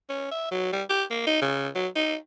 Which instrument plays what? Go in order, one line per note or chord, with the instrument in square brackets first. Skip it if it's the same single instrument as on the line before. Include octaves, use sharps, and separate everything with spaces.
[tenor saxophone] C#4
E5
F#3
G3
G4
A#3
D#4
C#3
F#3
D#4